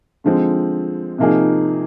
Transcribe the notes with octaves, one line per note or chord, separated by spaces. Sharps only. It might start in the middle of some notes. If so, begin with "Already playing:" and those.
D3 F3 G#3 C4
C3 F3 A#3 D#4 G#4